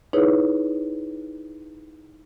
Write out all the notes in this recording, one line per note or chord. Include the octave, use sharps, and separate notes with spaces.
D#4 E4 G#4 B4 C#5